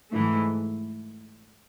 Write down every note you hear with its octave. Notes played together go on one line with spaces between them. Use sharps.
G#2 E3 A3